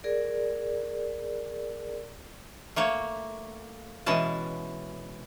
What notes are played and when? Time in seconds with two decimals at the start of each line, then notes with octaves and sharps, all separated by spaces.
0.04 G#4 A#4 D5
2.76 A3 A#3 C#5
4.06 B2 E3 G#3 C#4 A5